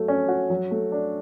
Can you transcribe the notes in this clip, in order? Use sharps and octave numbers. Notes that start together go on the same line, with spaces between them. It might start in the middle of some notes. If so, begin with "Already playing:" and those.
Already playing: F#3 A3
C#4
F#4
F#3
A3
D4